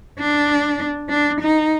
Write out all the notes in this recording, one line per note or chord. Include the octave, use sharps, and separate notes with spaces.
D4
D4
D#4